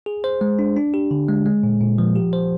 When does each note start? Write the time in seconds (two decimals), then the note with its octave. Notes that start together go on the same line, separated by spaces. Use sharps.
0.06 G#4
0.24 C5
0.41 G#3
0.59 D4
0.76 D4
0.94 G4
1.11 D3
1.29 G#3
1.46 G#3
1.63 A#2
1.81 A#2
1.98 F3
2.15 G4
2.33 C5